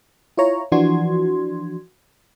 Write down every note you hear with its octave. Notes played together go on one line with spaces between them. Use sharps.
E4 F4 C#5 A#5
E3 F3 D4 F#4 C6 G#6